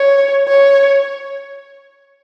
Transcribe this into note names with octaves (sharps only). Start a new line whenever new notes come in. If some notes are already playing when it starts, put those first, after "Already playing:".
Already playing: C#5
C#5